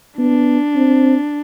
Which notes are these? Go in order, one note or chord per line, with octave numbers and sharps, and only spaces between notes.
B3 D4
C4